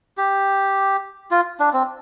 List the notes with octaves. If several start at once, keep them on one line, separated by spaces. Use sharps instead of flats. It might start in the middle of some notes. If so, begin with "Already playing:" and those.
G4
F4
D4
C4